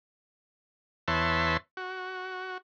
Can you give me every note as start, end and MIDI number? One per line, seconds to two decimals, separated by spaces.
1.08 1.57 40
1.08 1.57 71
1.08 1.57 73
1.08 1.57 76
1.08 1.57 81
1.08 1.57 84
1.77 2.58 66